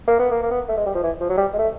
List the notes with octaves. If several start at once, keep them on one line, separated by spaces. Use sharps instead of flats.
A#3
B3
A#3
A#3
B3
A3
G#3
G3
F3
E3
F3
F#3
G3
G#3
A3